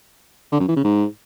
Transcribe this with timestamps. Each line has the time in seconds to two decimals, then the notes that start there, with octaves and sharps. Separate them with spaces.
0.52 D3
0.60 F#2
0.68 E3
0.76 C#3
0.84 G#2